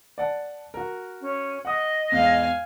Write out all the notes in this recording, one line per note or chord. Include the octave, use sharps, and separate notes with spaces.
D5 F#5 A5
F#4 A#4
C#4
D#5 F#5 D#6
E2 G#2 F5 G#5